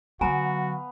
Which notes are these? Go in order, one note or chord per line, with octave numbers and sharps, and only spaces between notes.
D3 F#3 B3 F#4 F5 G#5 A#5